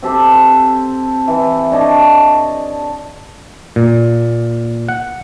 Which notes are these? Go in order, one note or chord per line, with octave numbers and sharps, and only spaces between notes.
C4 G4 A4 C5
C5 C6
E3
D4 C#5 D#5 A5
A#2
F#5